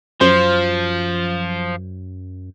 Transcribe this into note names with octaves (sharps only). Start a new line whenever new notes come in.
F#2 F3 C5